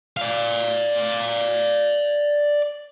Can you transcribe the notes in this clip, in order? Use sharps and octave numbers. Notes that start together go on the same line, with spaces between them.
D5 F5